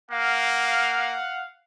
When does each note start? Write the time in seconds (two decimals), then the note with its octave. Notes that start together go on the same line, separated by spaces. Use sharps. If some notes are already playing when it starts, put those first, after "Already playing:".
0.11 A#3 F5 F#5